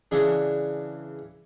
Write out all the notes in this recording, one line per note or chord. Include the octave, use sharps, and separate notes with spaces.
C#3 E3 D4 G#4